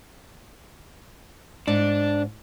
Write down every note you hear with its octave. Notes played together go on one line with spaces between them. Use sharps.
G#2 D4